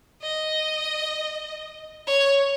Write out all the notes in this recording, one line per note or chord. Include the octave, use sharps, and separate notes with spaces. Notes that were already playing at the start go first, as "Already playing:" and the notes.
D#5
C#5